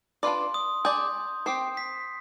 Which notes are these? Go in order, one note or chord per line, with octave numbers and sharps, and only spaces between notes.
D4 F4 B4 D5 C6
D#6
D4 G#4 D5 G6
C4 G4 C5 C7
B6